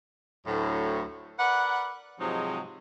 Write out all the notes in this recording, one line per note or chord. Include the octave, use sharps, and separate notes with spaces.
D2 A2 F#3
A#4 B4 D5 F#5
G#2 C3 F3 F#3 G#3 D#4